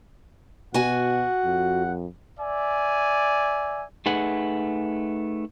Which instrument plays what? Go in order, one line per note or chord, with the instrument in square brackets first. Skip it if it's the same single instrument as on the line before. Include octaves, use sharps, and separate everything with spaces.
[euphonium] B2 [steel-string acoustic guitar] F#4 G#5 [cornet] F#5
[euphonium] F2
[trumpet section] D5 E5 G#5
[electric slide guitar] A3 D#4 G#4 B4 F#5